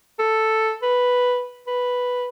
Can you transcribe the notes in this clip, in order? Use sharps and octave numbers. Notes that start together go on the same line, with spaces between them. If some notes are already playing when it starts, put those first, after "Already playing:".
A4
B4
B4